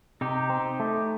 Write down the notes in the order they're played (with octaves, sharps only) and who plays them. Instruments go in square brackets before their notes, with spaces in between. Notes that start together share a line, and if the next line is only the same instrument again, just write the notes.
[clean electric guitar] C3 [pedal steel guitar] D#4 G4
[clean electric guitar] C4
A3